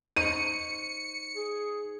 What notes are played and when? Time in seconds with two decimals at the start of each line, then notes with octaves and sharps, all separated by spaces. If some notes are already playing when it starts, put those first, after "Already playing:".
0.16 D#4 C5 C#6 C#7 D#7
1.36 G#4